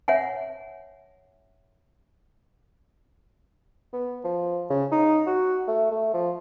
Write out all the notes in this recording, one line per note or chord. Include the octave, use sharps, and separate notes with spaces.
C#5 E5 F#5 G#5
B3
F3
C#3
D#4
F#4
A3
A3
F3